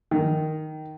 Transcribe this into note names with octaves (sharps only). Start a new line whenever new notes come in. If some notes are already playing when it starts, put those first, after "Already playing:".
D#3